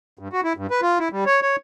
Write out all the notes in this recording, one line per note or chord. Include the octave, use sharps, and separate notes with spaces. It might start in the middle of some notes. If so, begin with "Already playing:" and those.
G2
F#4
E4
G2
B4
F4
E4
G3
C#5
C#5